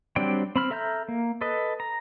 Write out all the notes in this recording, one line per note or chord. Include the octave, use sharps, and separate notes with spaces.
F#3 G3 C4 D4 G5
C4 B5 F6
A4 E5 A#5 F6 G6
A#3
A4 B4 D#5
A#5